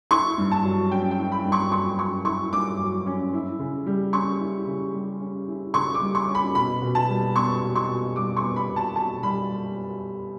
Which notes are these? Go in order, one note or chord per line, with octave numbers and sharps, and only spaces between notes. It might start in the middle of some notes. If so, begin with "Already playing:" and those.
E4 C#6
G2
A5
F#3
C#4 G5
G5
E4
B5
G2
C#6
F#3 C#6
C#4 C#6
E4 C#6
G2 D6
F#3
C#4
E4
C#3
G3
C#4 C#6
E4
C#3
G3
C#4
E4
C#3 C#6
D6
G3
C#6
C#4
B5
B2 B5
B2
A5
G3
B3 C#6
B2
C#6
B2
G3 D6
C#6
B3
B5
B2
A5
B2 A5
G3 B5